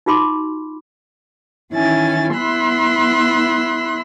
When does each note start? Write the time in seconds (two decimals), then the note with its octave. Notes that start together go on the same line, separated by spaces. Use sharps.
0.06 D#4 F4 F#4 B5 C6 D6
1.74 D#3 E3 C#4 E4 G#5 A6
2.35 B3 E4 B5 C6 E6 F#6